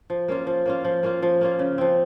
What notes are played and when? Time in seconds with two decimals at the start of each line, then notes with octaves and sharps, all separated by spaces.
0.10 F3
0.28 A#3 C#4 F4
0.47 F3
0.66 A#3 C#4 F4
0.85 F3
1.03 A#3 C#4 F4
1.22 F3
1.41 A#3 C#4 F4
1.59 C#3
1.78 F3 C4